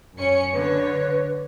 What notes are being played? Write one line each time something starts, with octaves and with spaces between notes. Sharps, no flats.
F#2 C#4 C#7
D3 B4 C#5